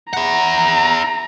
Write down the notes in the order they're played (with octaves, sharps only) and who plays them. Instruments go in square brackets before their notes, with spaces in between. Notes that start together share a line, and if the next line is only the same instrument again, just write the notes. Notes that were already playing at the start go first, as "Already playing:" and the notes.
[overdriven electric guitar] E4 F#5 [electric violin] A#5